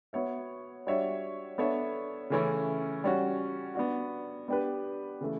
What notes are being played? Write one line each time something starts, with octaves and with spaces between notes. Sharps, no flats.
B3 F#4 C#5 E5
G3 D4 F#4 C#5 E5
B3 D4 A4 C#5 E5
C#3 E3 A3 C#4 E4
G3 C#4 F#4
B3 D4 F#4
B3 D4 G4 B4
C#3 E3 A3